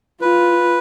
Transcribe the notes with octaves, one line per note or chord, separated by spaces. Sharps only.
F4 B4